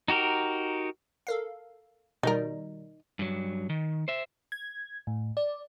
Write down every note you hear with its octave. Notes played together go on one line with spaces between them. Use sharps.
D#4 F#4 G4 A#4
A4 A#4 F5
B2 D#3 G3 D#4 A#4
G2 F#3
D#3
C5 E5
G#6
A2
D5